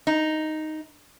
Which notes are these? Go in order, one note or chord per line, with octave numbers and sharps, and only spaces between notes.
D#4